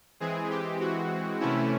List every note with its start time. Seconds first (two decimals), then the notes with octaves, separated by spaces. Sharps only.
0.20 E3 G#3 C4 G#4
0.50 G4
0.80 F#4
1.40 C3 E3 A3 C#4 E4